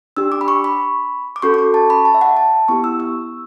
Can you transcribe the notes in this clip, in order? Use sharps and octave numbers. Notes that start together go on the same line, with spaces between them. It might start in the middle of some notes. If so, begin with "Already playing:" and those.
D4 G4 E6
D6
B5
C#6
B5
D6
C#4 F#4 A4 C#6
D6
C#6
A5
B5
A5
E5
F#5
A5
B3 E4 G4 C#6
E6
E6